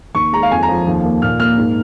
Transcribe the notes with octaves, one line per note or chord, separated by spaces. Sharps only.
D#2 C#6
G#3 A#5
F5
F2 G#5
A#5
F3
D#2
A#3
A#2 F6
A#3 F6
G#2